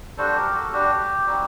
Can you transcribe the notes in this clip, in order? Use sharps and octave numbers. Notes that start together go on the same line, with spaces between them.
G3 D4 F#4 A4 C5
G4 A#4
F#4 A4
G3 D4 F#4 G4
G3 C4 D#4 F#4